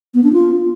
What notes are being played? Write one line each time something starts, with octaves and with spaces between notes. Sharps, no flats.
B3
D4
F4